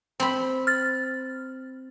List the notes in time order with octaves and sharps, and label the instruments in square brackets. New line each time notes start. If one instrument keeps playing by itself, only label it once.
[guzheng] C4 B5
[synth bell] F6 A6